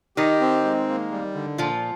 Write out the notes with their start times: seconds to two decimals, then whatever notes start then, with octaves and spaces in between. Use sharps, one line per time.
0.17 D#3 D#4 G4
0.41 C4
0.64 G#3
0.88 A#3
1.11 G3
1.35 D3
1.58 A#2 F3 F4